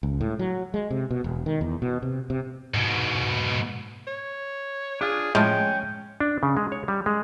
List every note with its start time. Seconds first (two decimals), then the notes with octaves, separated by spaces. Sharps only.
0.03 C#2
0.21 A2
0.39 F#3
0.74 G#3
0.91 C3
1.11 B2
1.24 E1
1.46 D#3
1.61 E2
1.82 B2
2.02 C3
2.30 C3
2.74 G#2 B2
4.07 C#5
5.01 D4 F4 G#4
5.35 A2 F3 G#3 C#4 G5
6.20 D4
6.43 C#3
6.57 G#3
6.72 C#5
6.88 G3
7.06 G#3